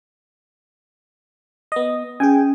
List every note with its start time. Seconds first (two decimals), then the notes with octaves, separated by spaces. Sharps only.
1.72 B3 D#5
2.20 C#4 G#4 G5 G#5